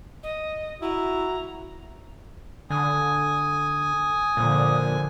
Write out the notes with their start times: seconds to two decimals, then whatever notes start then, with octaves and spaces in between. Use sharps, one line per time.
0.23 D#5
0.82 E4 F#4 A#5
2.70 D3 G#5 D#6
4.37 A#2 D3 F3